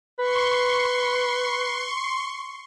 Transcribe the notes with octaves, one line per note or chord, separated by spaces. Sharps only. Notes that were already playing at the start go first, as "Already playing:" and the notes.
B4 C6 C#6